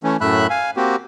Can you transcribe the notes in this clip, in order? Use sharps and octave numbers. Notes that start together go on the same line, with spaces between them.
E3 A3 C#4
F#2 A2 A3 E5 B5 F#6
F5 G#5
A#3 C4 F#4 G4